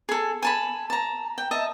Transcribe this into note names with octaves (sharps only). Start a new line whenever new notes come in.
G#4 A4
G#5 A5 B5
A5 A#5
G5
D#5 E5 A5